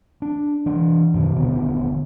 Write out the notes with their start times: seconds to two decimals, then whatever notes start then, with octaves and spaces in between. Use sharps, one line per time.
0.22 D4
0.66 E3 D4
1.14 F#2 B2 D#3
1.36 D#1 D3 B3